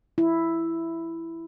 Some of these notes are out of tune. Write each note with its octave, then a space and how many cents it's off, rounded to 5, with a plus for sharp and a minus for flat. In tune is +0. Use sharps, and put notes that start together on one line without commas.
E4 +5